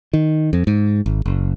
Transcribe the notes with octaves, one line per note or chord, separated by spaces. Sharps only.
D#3
F2
G#2
G#1
F#1